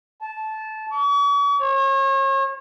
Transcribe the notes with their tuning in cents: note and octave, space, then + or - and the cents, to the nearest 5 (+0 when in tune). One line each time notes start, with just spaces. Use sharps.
A5 -15
C#6 +45
C#5 -35